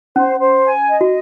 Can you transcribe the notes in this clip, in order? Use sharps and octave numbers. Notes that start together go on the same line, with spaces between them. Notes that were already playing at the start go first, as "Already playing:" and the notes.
C#4 C5
C5
G#5
D#5
F#4